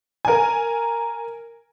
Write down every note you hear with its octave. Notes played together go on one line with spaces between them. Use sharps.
A#4 G#5